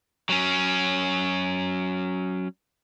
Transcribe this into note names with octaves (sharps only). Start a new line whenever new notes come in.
F#3 C#4